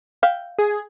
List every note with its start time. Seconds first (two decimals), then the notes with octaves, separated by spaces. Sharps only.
0.23 E5 F5 G5
0.59 G#4